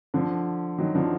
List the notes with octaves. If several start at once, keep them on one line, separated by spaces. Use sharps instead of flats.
D3 F3
D#3 F#3
D3 F3